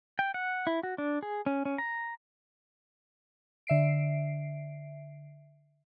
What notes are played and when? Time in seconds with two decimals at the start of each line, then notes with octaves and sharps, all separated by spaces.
0.19 G5
0.34 F#5
0.67 E4
0.83 F#4
0.98 D4
1.23 G#4
1.46 C#4
1.65 C#4
1.78 A#5
3.67 D3 E5 C7 D7